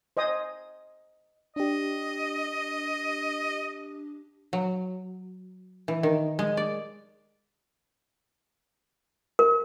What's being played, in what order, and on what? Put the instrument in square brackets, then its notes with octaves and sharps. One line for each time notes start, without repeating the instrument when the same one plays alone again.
[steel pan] C5 D#5 G#5 D#6
[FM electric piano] D4 G4 [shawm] D#5
[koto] F#3
E3
D#3
G#3
D5
[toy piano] A#4